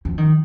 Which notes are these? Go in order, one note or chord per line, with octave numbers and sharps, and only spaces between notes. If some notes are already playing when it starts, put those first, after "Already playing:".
F3
D#3